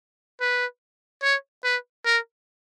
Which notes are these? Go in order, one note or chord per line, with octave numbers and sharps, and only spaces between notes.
B4
C#5
B4
A#4